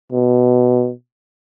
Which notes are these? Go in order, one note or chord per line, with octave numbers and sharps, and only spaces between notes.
B2